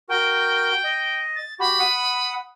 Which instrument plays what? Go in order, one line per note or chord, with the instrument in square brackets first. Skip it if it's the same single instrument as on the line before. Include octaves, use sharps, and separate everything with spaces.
[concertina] F#4 A#4 [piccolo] G5
[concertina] D#5
[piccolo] A6
[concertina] F#4 G4 [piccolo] B5
[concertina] F#5 D#6